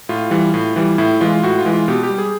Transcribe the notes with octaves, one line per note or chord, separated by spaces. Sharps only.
A2 F4
E3 G3
A2
E3 G3
A2 E4
E3 G#3 F4
A2 F#4
F4
E3 G#3
F4
B2 G4
G4
G3
G#4